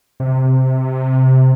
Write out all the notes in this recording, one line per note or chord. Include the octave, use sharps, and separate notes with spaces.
C3